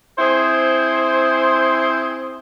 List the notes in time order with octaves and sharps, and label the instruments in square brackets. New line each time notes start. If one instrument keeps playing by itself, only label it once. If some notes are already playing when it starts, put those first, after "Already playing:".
[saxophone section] C4 E4 G#4 C5